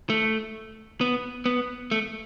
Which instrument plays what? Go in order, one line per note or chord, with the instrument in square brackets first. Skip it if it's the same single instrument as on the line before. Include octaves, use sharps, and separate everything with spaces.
[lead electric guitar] A3
B3
B3
A3